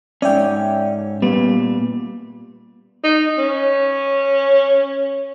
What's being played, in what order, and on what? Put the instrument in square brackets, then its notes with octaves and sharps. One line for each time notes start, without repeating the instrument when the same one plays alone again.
[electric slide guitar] G#2 C#4 [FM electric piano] D5 E5 G5
[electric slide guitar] A#2 G3 [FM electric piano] B3
[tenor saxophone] D#4
C#4